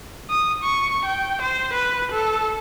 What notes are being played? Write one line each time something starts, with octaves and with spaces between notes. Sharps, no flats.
D#6
C#6
G5
C5
B4
A4